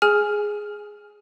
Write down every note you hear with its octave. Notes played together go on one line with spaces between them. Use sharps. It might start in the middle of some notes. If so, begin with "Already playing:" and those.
G#4 G#5 F6